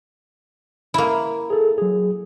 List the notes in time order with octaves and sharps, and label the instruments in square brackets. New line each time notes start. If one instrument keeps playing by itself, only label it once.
[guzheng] A#3 E4
[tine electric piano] G#4 A4
F#3 G#4